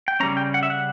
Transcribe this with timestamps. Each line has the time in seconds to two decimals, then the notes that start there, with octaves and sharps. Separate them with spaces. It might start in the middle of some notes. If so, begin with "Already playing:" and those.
0.08 G5
0.20 C#3 G3 A#3 C#4 A#5
0.37 G5
0.54 F#5
0.63 E5
0.70 F#5